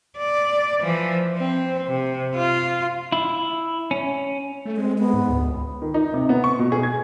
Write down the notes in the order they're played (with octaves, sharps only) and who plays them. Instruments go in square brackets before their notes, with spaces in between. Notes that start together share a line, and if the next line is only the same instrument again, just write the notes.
[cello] D5
E3 F3
C4
C3
F4
[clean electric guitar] E4
C#4
[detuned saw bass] A3
[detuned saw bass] G#3 [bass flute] C4
[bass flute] B3
[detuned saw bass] G#2
D2
C#2
[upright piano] D#3
D#4
C3
B3
C#6
B2
G#4
G#6